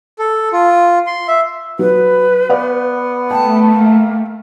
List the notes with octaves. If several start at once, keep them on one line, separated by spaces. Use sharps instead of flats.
A4
F4
C6
E5
F#3 B4
B3 D5 F#5
A3 G5 A5
A#3